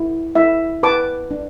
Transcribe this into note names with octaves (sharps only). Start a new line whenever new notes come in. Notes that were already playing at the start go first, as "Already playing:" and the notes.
Already playing: E4
E4 E5
B4 A5 D6
D4